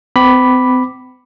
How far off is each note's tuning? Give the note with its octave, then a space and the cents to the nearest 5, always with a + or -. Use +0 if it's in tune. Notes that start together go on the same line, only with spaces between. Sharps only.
C4 -40 B5 +0 D6 +0